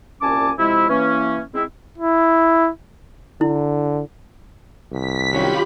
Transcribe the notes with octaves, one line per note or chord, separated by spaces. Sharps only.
C2 A#2 C#4 G#5 A5 D6
C3 F3 G#3 E4
E3 A#3 C#4
G#3 C4 E4
E4
D3 E4
C2 B6
D#3 F#3 C#4 F4 G4 B5